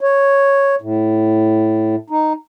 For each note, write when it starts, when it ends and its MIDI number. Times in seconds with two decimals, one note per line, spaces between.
0.01 0.75 73
0.82 1.96 45
2.10 2.33 63